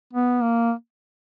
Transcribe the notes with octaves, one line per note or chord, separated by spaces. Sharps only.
B3
A#3